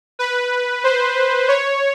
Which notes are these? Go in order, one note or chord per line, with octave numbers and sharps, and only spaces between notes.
B4
C5
C#5